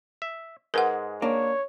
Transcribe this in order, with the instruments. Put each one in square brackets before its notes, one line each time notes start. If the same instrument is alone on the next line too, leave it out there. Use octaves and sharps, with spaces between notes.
[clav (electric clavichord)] E5
[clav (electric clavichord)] G#2 G#3 [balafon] A#4 B4 F#5
[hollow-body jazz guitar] A#3 D4 [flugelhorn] C#5